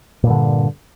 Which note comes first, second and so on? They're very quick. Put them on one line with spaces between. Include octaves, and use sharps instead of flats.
A#2 G2 D3